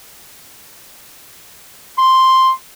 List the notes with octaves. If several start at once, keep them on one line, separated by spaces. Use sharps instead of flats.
C6